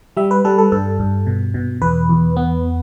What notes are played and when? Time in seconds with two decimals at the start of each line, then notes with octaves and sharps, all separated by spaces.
0.17 G3 E5
0.31 B4
0.45 G3 A4
0.58 A4
0.72 G2 A4
0.99 G2
1.26 B2
1.54 B2
1.82 E2 B4
2.09 E2
2.36 B3